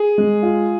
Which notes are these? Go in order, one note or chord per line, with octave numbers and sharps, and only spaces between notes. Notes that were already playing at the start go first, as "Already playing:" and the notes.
Already playing: G#4
G#3
F4